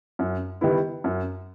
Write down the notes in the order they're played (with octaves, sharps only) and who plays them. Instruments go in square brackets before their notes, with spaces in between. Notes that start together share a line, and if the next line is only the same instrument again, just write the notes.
[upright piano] F#2
D#3 G3 B3 E4
F#2